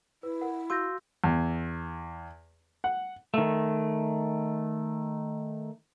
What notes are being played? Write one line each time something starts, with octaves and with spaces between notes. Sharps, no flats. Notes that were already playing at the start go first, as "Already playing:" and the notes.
E4 B4
A#4 F#5
F#4 F5 C6 E6 G6 A#6
E2
F#5
D#3 A3